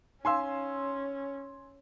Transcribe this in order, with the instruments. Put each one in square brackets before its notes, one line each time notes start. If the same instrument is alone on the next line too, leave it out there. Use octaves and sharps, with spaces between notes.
[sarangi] C#4 [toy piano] D#4 F5 [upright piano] G#5 C6 E6